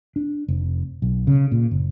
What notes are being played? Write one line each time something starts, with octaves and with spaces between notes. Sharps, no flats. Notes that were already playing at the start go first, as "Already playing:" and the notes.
D4
F1
B1
C#3
A#2
F#1